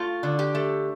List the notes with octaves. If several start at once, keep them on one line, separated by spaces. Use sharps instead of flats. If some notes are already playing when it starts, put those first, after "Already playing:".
Already playing: A3 F4
D3
G4
A3